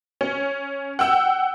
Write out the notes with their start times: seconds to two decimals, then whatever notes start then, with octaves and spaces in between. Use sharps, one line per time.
0.21 C#4
0.99 F#5 G5 E6